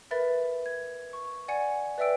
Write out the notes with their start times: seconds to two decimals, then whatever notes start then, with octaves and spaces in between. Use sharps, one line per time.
0.11 A#4 B4 E5 B5 A6
0.66 G#6
1.13 C#6
1.48 D5 F#5 G#5 G#6 C#7
1.98 B4 D5 E5 G5 E6 D7